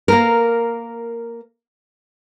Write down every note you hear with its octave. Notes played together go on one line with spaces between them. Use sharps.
A#3 A#4